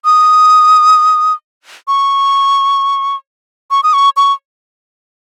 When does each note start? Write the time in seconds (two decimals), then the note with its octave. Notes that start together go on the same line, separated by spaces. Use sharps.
0.05 D#6
1.88 C#6
3.71 C#6
3.83 D#6
3.94 C#6
4.17 C#6